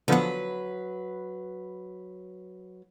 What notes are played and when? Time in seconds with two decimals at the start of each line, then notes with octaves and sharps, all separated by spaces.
0.08 D3 F3 F#3 B3 B4